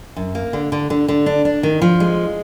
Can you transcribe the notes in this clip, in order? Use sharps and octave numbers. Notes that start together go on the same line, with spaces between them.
F#2
A#3
D3
D3
D3
D3
D4
D4
D#3
F3
G#3